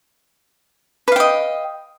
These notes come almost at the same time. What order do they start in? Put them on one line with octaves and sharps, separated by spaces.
B4 F5 G5 D#5